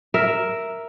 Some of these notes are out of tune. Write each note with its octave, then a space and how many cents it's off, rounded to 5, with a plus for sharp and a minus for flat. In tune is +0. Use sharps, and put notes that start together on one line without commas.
A#4 +0 E5 +0